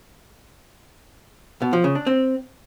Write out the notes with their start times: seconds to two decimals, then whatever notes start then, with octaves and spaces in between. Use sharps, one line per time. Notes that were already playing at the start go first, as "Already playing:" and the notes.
1.62 B2
1.73 F3
1.84 C#3
1.95 D4
2.07 C4